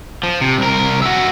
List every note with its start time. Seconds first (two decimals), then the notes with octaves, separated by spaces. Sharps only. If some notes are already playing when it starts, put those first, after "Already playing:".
0.23 F3
0.41 C3
0.58 C2 A#4
1.02 F#4 E5